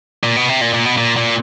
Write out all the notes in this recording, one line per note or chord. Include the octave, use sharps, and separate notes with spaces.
A#2
B2
C3
A#2
A#2
B2
A#2
A#2